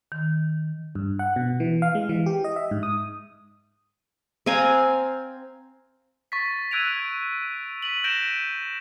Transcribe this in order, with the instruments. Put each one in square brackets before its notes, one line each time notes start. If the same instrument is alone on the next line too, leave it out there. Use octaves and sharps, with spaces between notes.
[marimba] D#3
[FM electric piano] G2
F#5
B2
E3
F5
G#3
E3
G4
D#5
E5
G#2
D#6
[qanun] C4 F5 G#5 A#5
[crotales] C#6 A6 B6
E6 F#6 G#6 D7 D#7 F7
B6 D#7 F#7
G6 A#6 D7 E7 G7